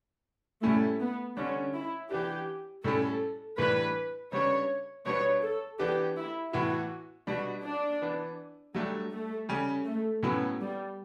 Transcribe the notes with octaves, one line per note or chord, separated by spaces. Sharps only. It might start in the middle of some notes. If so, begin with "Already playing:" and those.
A2 G3 A3 C#4 E4
B3
D3 G3 C#4 D4
E4
E3 B3 D4 G4
A2 G3 C#4 E4 A4
A2 E3 G3 D4 B4
C#3 G3 B3 D4 C#5
B2 G3 B3 D4 C#5
A4
E3 B3 D4 G4
E4
A2 E3 B3 E4 F#4
B2 G3 D4 F#4
D4
E3 B3 D4
F#3 G3 A3 D4
A3
C#3 G3 C#4
A3
A2 F#3 B3 C#4 E4
G3